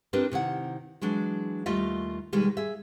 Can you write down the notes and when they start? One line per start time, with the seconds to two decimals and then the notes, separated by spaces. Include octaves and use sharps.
0.13 C4 D4 E4 G4 A#4 B4
0.32 C3 D#3 E4 F#5
1.01 E3 F#3 G#3 D4
1.66 D#2 G3 A3 F4 D#5 E5
2.33 B2 D#3 G3 G#3
2.57 G#4 E5